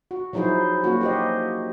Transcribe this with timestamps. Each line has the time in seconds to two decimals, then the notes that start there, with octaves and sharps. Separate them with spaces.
0.11 F#4
0.33 F3 F#3 D#4 E4 G#4 C5
0.84 F#3 A#3 C#4 F#4
1.01 G4 C5 D#5